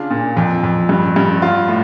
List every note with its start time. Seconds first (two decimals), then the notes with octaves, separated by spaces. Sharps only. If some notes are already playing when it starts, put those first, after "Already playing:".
Already playing: C#3 D4 F4
0.10 A#2
0.37 F2
0.64 F2
0.89 G2
1.16 G2
1.42 F4
1.69 A2